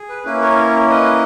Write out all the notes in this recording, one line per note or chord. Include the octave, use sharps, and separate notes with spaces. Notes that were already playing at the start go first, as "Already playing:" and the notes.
Already playing: G#4
B4
A#3 C#4 E4 B4
A#4 C#5
B4 D#5